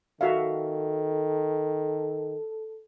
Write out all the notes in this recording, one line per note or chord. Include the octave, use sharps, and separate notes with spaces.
D#3 F#4 A4 E5 F5